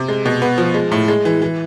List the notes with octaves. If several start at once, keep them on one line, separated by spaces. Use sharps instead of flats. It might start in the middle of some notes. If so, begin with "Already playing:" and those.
Already playing: C3
G#3
B2
B3
F3
G#3
A2
G#3
E3
E3